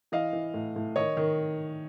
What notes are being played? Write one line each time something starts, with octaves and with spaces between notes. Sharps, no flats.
E3 D#5 F5
E3
A2
A2
D#3 C#5 D#5
D#3